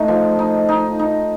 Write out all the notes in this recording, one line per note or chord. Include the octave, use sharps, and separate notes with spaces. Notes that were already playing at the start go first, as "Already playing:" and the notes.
Already playing: A3 D#4
F3
D#4
D#4
D#4